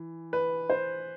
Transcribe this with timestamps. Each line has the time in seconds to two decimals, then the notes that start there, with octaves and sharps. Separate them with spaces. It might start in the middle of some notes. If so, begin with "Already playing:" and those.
Already playing: E3
0.33 B4
0.70 C5